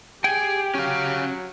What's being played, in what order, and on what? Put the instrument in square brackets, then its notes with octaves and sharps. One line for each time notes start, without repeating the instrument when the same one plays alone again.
[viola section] G4 [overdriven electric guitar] G#4 [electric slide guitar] G5
[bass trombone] F#3 [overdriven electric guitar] C#4 F5